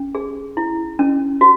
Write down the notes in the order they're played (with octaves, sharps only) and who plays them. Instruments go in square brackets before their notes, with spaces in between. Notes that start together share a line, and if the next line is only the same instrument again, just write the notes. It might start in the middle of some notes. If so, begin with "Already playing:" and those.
Already playing: [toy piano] C#4
G#4
E4
C#4
F#4